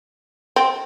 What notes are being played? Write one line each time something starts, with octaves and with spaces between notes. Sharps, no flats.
C4